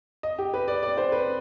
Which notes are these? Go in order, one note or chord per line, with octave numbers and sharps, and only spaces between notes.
D#5
G4
B4
D5
D5
C5
B4